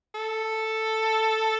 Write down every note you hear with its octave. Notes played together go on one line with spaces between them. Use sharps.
A4